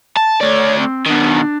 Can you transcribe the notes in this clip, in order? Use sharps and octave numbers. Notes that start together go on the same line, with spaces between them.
A5
A3 C#5 D5
C4
B2 D#3 D4